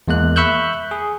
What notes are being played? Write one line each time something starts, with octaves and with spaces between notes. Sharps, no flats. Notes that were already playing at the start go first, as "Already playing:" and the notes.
E2 G#3 A#3 F#6
E5 B5 C#6 E6 F#6 G6
G#4